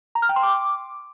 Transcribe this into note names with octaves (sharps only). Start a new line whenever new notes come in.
A#5
F6
G5
C6
D6